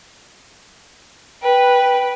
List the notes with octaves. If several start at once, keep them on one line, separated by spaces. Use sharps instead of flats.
B4 G5